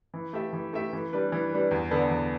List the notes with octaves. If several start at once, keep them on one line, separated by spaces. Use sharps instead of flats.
E3
A3 G4 E5
E3
A3 G4 E5
E3
G3 D4 B4
E3
G3 D4 B4
E2
D3 B3 D4 A4
E2